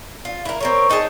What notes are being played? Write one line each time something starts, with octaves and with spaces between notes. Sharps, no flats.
F4
E4 A#4
C4 A#4 C#5
D4 D#4 G#4 A5